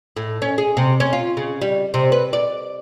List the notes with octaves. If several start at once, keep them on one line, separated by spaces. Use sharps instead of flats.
A2
C#4
G#4
C3
C#4
F4
C#3
G3
C3
B4
D5